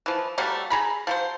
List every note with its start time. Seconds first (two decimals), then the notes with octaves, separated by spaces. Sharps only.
0.06 E3 F3
0.38 F#3 G3 A3 A#3
0.70 G#4 A#5 B5
1.07 F3 F#3 C5